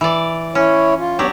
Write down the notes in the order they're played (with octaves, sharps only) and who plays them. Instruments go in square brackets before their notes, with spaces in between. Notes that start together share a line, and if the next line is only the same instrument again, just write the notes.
[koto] E3 D5
[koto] C#4 [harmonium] E4 C#5
[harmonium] F4
[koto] F#3 D4 G4 [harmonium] B3 C#5